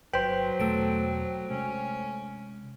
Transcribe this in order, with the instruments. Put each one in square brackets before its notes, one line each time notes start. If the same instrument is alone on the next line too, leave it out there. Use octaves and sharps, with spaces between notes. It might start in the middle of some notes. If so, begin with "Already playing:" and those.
[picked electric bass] G1 [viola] F#3 [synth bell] B4 [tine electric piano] C5 G5
[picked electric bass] E2 B2 [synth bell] A3 A4 D7
[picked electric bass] C3 G#3 [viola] C#4